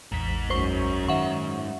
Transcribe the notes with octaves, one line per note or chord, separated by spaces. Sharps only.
A1 E2 G#2 B6
F#2 C5 C#6
D#3 E5 F#5 C#6